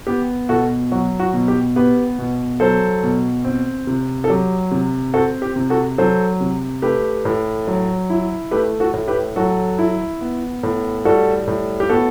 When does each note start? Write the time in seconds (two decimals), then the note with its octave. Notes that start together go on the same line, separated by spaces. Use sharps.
0.07 B3 G4
0.49 B2 F#4 A4
0.92 F#3 F#4
1.19 F#4
1.34 B2
1.48 G4
1.76 B3 G4 B4
2.19 B2
2.60 F#3 A4 C5
3.03 B2
3.44 C4
3.87 C3
4.24 A4
4.29 F#3 G4
4.71 C3
5.14 C4 F#4 A4
5.42 G4
5.56 C3
5.70 F#4 A4
5.98 F#3 A4 C5
6.40 C3
6.82 A3 G4 B4
7.25 A2
7.67 F#3
8.10 E4
8.51 A3 G4 B4
8.80 F#4 A4
8.94 A2
9.08 G4 B4
9.36 F#3 F#4 A4
9.78 E4
10.21 B3
10.63 A2
11.05 G3 F#4 A4
11.47 A2
11.80 G4
11.90 B3 F#4 A4